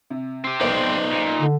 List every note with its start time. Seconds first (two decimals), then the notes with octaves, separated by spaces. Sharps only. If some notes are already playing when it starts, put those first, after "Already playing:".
0.10 C3
0.44 C4 G4
0.61 B1 D#4 B4 C5 D5
1.12 A#2
1.39 D3